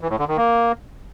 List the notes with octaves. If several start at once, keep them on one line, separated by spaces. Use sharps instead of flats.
E3
A2
D3
D#3
A#3